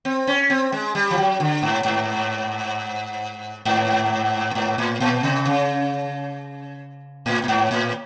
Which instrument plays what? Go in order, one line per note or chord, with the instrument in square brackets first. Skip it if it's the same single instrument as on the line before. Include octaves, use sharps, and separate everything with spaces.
[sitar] C4
C#4
C4
G#3
G3
F3
F#3
D3
G#2
G#2
G#2
G#2
A2
A#2
C3
C#3
A2
A2
G#2
A2